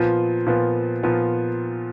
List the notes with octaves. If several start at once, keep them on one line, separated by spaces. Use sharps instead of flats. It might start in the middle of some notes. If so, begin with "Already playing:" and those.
Already playing: A#2 F3 B3
A#2 F3 B3
A#2 F3 B3